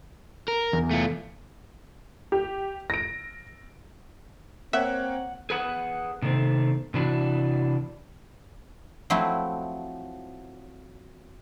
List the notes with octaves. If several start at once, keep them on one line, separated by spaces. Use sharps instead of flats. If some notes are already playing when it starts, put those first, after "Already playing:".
A#4
E2
A3 F4
G4
A#6 D7
A#3 C4 C#5 E5 F#5 G5
G#4 B4 F#5
C3 D#3 A3 C4
C3 E3 D4 F#4
F3 F#3 A3 C4 E4